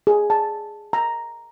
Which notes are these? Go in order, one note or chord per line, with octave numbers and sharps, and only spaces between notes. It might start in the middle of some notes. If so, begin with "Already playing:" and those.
G#4
A5
A#5